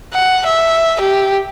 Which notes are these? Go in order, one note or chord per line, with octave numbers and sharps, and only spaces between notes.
F#5
E5
G4